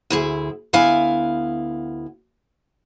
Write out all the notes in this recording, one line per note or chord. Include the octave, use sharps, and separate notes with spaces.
D2 E4 G#4
D2 B3 E4 F5 G#5